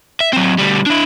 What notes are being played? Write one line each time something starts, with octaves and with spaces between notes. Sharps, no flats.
E5
F#3 C4
D2 G3
D4 E4